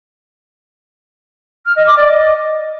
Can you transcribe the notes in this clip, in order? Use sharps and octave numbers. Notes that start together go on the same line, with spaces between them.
F6
D#5
D6
D5
D#5